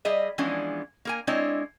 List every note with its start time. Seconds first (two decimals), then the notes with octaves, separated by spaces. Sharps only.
0.05 G3 G#4 D#5 E5
0.38 E3 F3 G#3 B3 C#4 D4
1.05 A#3 A#4 G#5
1.27 G#3 C4 D4 E4 C#5 D#5